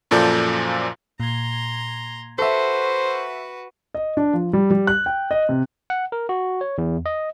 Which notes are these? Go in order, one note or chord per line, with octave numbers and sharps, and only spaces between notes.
F#2 A#2 F3 A4 D5 G6
A#2 A#5 C6 G#6
F#4 A4 B4 C5 E5 F#5 C#6
D#5
D4
F3
G3
G3
F#6
G5
D#5
C3
F#5
A#4
F#4
C#5
E2
D#5